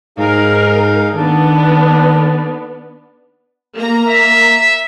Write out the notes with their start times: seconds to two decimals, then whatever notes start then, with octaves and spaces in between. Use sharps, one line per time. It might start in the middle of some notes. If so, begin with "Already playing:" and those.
0.18 G#2 D#4 G#4 A#4 F5
1.15 D#3 B3 D4 A4
3.75 A#3 A#5
4.08 E5